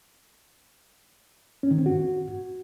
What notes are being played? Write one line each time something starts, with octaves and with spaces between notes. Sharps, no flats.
C#4
D#3
C4
F#4